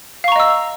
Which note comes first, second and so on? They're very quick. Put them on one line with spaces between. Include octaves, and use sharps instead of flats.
F5 C#6 A#5 D#5 E6